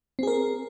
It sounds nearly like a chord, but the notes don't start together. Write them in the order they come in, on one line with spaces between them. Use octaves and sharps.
C4 G#4 A#4